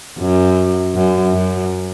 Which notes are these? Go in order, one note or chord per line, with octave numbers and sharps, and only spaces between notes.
F#2
F#2
F#2